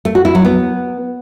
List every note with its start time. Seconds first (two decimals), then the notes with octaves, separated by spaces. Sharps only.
0.05 A3
0.15 F#4
0.25 E4
0.35 F#3
0.45 B3